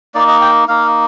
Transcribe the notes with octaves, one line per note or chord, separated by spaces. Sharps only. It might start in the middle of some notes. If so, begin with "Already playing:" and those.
A#3 D#4 D5
D#5
G5
A#3 D#4 F5